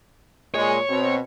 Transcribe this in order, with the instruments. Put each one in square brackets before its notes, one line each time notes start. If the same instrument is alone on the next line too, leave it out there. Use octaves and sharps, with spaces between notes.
[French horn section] A#2 G#3 [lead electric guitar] C#5
[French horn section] B2 C4